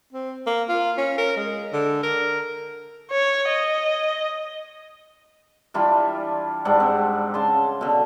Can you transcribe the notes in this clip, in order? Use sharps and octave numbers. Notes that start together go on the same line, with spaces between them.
C4
A#3
F4
C#4
A#4
G#3
D3
A#4
C#5
D#5
E3 G3 D4 F4
G#2 G3 D4 F#5
C4
C#3 A5 C6
B2 D3